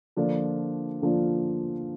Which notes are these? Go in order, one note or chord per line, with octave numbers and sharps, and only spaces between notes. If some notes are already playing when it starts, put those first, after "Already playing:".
D3 F3 A#3 D4 F4
D3 F3 A#3 D4 F4